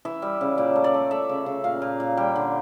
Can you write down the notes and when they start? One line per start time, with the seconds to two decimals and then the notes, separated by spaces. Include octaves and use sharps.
0.05 E3 E5
0.22 G3
0.41 C#3
0.58 A#2 D5
0.76 A3
0.84 D5
0.94 A3
1.11 A3 E5
1.29 C#3
1.46 C#3
1.64 A#2 F5
1.82 A#2
2.00 A#2
2.17 G3 G5
2.36 D3